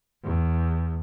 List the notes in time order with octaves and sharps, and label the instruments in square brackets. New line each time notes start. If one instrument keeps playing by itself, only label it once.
[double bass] E2